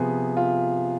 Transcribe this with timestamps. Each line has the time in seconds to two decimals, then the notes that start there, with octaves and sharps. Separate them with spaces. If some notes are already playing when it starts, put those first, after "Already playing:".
Already playing: C3 F3 B3 G#4
0.37 F4